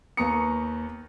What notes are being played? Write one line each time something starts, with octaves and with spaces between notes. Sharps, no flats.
D#2 B4 A#5 C#6 D#6 C#7